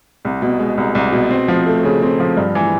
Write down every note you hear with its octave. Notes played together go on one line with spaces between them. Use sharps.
C2
B2
G#3
C2
C2
B2
C4
F3
A3
C#3
C4
F3
G2
E3